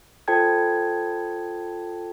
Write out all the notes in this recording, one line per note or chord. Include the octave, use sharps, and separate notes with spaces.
F4 A4 C5 G5 A5 G#6